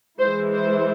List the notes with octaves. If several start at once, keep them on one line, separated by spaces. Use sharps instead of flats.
E3 G#3 E4 C5
C5